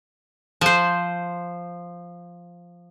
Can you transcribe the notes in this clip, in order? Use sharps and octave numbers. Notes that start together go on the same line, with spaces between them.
F3 C5